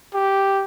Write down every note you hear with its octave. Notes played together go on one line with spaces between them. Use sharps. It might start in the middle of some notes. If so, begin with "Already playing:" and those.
G4